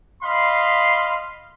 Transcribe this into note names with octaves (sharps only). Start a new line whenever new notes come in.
D#5 F5 B5 C6